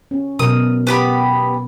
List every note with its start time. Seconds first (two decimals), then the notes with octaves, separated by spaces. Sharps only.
0.11 C#4
0.39 B2 F#3 A#4 D#6
0.87 B3 G4 B5